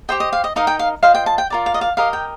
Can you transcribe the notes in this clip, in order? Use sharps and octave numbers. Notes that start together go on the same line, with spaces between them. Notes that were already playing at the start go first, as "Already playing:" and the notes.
G4 C5 D#5 G5
D#5
F5
D#5
D#4 A#4 D#5 F5
G5
F5
F4 C5 D#5 F5
G5
A5
G5
F4 A#4 D5
F5
D#5
F5
G4 A#4 D#5 F5
G5